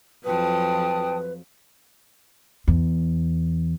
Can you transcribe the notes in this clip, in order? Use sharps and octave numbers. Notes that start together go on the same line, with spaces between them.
F2 F3 F#3 B4 G5 A5 D#6
E2